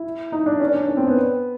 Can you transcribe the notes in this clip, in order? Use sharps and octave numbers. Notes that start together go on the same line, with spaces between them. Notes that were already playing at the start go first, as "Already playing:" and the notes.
Already playing: E4
D#4
D4
C#4
D4
C#4
C4
B3